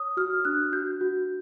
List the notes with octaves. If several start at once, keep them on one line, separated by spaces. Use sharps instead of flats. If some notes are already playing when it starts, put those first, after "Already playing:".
Already playing: C#5 D#6
F#4 F6
D4 F#6
F#4 G6
F#4